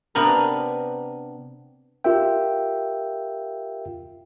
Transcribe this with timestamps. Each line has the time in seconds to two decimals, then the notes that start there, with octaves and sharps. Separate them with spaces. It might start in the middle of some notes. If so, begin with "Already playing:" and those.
0.15 C3 B3 D4 A#4
2.04 F4 G4 A#4 E5 G5